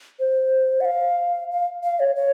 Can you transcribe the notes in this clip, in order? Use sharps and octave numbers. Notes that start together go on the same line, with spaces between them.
C5
F#5
F5
F5
F5
C#5
C#5